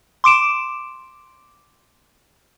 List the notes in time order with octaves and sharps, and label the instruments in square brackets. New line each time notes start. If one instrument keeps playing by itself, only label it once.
[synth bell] C6 D6 D7 E7